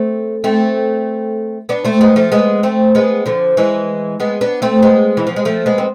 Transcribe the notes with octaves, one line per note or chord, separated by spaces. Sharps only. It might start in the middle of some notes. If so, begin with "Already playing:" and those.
Already playing: A3 C4
A3 C4
B3 D4
A3 C4
G#3 B3
F3 A3
G#3 B3
A3 C4
G#3 B3
D3 F3
E3 G#3
G#3 B3
B3 D4
A3 C4
G#3 B3
E3
F3
G#3
F3 A3
G#3 B3
C4